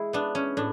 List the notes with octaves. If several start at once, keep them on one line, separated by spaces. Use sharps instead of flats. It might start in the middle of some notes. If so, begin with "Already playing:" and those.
Already playing: G#3 E4
B3 D4
C#4
A2 D4